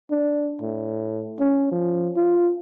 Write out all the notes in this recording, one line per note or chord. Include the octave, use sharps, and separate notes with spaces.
D4
A2
C#4
F3
F4